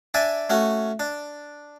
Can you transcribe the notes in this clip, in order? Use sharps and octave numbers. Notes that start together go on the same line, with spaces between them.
D4 D5 E5 G#5
A3 C#4 F#4
D4